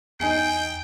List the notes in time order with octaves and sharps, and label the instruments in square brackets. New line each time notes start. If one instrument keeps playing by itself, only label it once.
[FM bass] E2 [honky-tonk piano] D#4 G#5 C7 [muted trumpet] G5